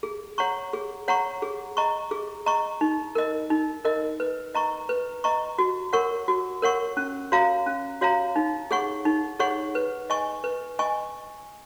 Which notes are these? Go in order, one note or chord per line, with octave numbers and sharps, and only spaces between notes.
G#4
C#5 F#5 A#5 C#6
G#4
C#5 F#5 A#5 C#6
G#4
D#5 A#5 C#6
G#4
D#5 A#5 C#6
D#4
A#4 D#5
D#4
A#4 D#5
B4
D#5 A#5 C#6
B4
D#5 A#5 C#6
F#4
A#4 C#5 F#5 C#6
F#4
A#4 C#5 F#5 C#6
C#4
F#4 C#5 F5 A#5
C#4
F#4 C#5 F5 A#5
D#4
G#4 C#5 F#5 C#6
D#4
G#4 C#5 F#5 C#6
B4
D#5 G#5 C#6
B4
D#5 G#5 C#6